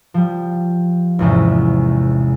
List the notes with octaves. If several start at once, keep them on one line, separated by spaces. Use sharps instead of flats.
F3 G3
G#1 E2 C3 C#4